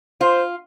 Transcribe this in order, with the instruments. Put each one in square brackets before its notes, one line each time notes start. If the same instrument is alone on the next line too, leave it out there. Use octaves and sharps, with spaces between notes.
[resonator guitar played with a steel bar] F4 [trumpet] C5